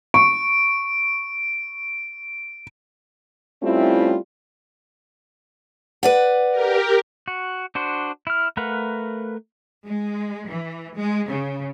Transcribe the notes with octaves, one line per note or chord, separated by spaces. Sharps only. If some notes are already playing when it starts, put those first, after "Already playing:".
C#6 D7
G3 A3 C4 C#4 E4 F4
B4 D5 F#5
G4 A#4
F#4
D4 F#4 C5
E4 F6
A3 A#4 B4 F5 F#5
G#3
E3
G#3
C#3